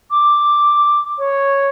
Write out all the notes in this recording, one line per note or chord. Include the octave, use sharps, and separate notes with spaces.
D6
C#5